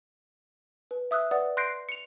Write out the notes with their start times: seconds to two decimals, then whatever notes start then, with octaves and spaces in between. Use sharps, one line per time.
0.91 B4
1.11 E5 D#6 E6 F#6
1.31 B4 D5 F#5 D#6
1.57 C6 F#6 G6 A#6 C7 D7
1.89 C#7 F7